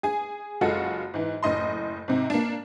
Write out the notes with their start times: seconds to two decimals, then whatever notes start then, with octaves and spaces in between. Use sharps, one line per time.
0.03 G#4 G#5
0.61 F#1 G#3 F4 F#4 A4 F#5
1.14 G#2 E3
1.43 F#1 A2 D#5 C6
2.08 G#2 C3
2.30 A#3 D4